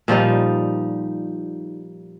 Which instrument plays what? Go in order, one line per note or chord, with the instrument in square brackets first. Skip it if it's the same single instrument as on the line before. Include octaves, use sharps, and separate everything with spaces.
[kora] A#2 F3 G3 D#4